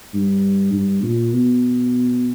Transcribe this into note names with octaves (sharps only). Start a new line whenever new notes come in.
G2
G2
A#2
B2